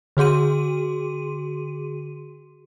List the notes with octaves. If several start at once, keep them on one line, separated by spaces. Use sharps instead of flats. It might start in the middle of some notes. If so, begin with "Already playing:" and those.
D3 F#4 G#4 C6 D#7